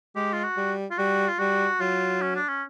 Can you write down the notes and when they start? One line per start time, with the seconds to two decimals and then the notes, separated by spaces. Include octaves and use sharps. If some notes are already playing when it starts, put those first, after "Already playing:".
0.16 G#3 G4
0.33 F4
0.44 F#4
0.57 G3
0.91 F4
0.98 G3 F#4
1.28 F4
1.39 G3 F#4
1.81 F#3 F4
2.22 C#4
2.35 D4
2.48 C#4